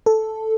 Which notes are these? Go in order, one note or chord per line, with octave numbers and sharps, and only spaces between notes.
A4